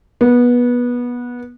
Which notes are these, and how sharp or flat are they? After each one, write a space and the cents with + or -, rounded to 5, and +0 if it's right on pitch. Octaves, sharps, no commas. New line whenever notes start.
B3 -20